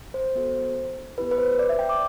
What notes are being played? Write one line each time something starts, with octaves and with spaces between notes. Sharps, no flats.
C5
B3 F#4 A4
B3 E4 G4 B4
B4
C5
D5
E5
G5
D6